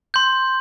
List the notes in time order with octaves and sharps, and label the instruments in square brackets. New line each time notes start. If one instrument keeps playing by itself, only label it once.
[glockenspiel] C6 G6